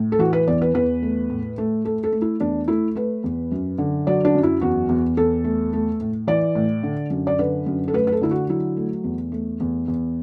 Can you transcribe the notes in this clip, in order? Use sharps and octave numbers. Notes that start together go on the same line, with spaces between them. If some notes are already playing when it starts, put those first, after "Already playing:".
Already playing: A2
A4
E3 F#4
B4
E2 D5
B4
E2 B4
A3
A2
A3
A3 A4
A4
A3
E4
E2 D4
A3 E4
A3 B4
E2
F#2
D3
F#3 D5
D4
F#2
E4
E2 F#4
E2
E2 A4
A3
A3
A2
E3 D5
A2
D3
F#2
D5
D3 B4
F#2
A4
A3 B4
B4
A4
D3 E4
F#4
F#3 E4
A3
E2
A3
E2
E2